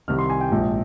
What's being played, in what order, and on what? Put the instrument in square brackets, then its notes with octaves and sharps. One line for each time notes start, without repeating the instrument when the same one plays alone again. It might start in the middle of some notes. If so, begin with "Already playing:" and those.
[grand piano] C2 C3 D#3 F6
C6
G#5
G5
A#1 G#2 F3